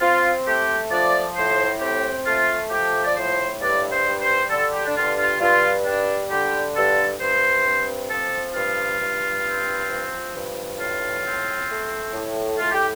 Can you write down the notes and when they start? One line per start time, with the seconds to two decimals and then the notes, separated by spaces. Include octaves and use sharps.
0.01 C4 F4
0.46 A3 G4
0.91 F3 D5
1.36 A2 C5
1.80 C4 G4
2.26 A3 F4
2.70 F3 G4
3.05 D5
3.16 A2 C5
3.60 G2 D5
3.91 C5
4.05 G3
4.21 C5
4.50 D3 A4
4.73 G4
4.85 D4
4.95 G2 F4
5.18 F4
5.40 G2 F4
5.85 G3 D4
6.30 D3 G4
6.76 G2 A4
7.19 G2 C5
7.65 C4
8.09 F3 A4
8.55 G2 F4
9.00 G2
9.45 C4
9.89 F3
10.34 G2
10.79 A2 F4
11.25 C4
11.69 A3
12.13 A2
12.59 A2 F4
12.72 G4